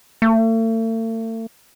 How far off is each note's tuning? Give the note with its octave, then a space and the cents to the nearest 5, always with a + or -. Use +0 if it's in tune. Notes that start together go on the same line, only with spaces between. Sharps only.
A3 +40